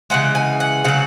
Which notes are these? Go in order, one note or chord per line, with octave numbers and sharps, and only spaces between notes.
C#3 E3 G#3 F#5
G#5
F#5
C#3 F#3 F#5